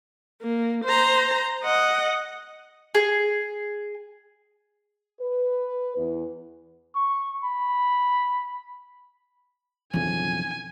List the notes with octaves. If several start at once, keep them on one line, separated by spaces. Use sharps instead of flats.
A#3
C5 A#5
D#5 F#5
G#4
B4
E2
C#6
B5
B1 F2 C#3 E3 D4 G#5